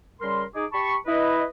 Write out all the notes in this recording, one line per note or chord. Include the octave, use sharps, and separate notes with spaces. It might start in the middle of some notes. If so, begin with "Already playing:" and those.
C#3 G3 A#4 C6
D#4 G#4 D6
G4 A5 B5 C#6
E4 B4 D#5